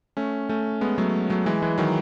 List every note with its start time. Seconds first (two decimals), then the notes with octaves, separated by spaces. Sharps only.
0.17 A3 C#4
0.49 A3 C#4
0.81 G#3 B3
0.98 F#3 A3
1.30 F#3 A3
1.46 E3 G#3
1.62 E3 G#3
1.78 D#3 F#3